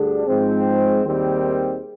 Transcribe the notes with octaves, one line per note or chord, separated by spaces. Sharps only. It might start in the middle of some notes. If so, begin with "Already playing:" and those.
Already playing: D2 D3 G3 D4 G#4
G#2 F3 G#3 C4
D#2 D#3 G3 C4